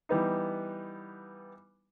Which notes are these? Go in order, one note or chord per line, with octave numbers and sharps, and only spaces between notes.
E3 G3 B3 D#4